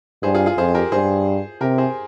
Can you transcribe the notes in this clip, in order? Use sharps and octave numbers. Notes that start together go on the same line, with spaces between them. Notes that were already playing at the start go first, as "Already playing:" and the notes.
G2 G#4 C5
F4 G#4
F4 G#4
F2 G#4 C5
G4 A#4
G2 G#4 C5
C3 G4 A#4
G#4 C5